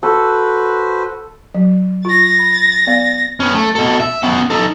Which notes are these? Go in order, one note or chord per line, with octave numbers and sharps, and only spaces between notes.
F#4 A4 B4 C5
F#3
F4 A6 A#6
B5
B3 D5 F5
B3 C#4
A3
B2 A4
E5
B3 C#4
D#4 A4